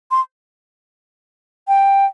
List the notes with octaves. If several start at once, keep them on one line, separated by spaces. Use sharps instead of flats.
C6
G5